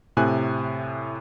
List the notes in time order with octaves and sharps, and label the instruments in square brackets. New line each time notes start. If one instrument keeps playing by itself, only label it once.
[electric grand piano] A2 C3 G#5 F#6